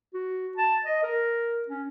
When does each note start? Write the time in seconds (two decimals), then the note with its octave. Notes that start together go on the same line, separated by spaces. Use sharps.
0.14 F#4
0.58 A5
0.84 D#5
1.03 A#4
1.68 C#4